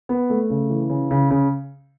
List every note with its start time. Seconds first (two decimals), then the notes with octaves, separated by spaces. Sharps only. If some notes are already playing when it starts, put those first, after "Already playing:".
0.09 B3
0.30 A3
0.50 C#3
0.70 E3
0.90 C#3
1.11 C#3
1.31 C#3